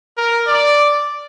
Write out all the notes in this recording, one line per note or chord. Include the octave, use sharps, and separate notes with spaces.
A#4
D5